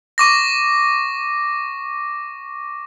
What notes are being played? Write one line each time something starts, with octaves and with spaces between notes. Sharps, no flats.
C#6 D6 A#6